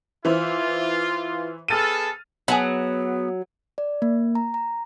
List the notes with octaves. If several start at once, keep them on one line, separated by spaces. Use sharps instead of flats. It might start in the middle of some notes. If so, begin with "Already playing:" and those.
E3 E4 F4 C5
B3 G#4 A4 F6 A6 D#7
F#3 B3 G#4 A5 B5
D5
A#3
A#5
A#5